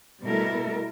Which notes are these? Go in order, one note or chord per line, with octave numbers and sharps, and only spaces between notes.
B2 G3 A3 E4 A4 A#4